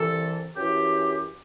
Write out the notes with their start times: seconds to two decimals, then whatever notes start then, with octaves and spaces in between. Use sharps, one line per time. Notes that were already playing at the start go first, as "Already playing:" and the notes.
Already playing: C2 C3 E3 A4
0.56 F#2 E3 G4